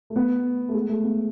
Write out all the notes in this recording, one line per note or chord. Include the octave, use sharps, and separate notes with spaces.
A3
B3
A3
G#3
A3
B3